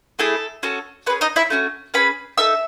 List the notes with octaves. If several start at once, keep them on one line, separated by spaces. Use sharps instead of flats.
A3 E4 G#4 A4
C#4 F#4 A4
C#4 G#4 B4
D#4 D#5
E4 E5
A3 C#4 F#4
C#4 G#4 B4 B5
D#4 A4 E5 E6